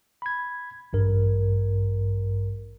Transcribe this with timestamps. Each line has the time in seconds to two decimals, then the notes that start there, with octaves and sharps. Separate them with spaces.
0.22 B5 G#6
0.93 A1 G2 A#4